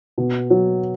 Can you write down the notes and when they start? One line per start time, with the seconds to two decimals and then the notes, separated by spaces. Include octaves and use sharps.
0.18 B2
0.50 F#3